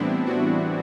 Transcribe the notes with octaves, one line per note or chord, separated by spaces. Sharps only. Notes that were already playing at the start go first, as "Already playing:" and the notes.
Already playing: A2 E3 G3 B3 C4 D4 E4
D4 F#4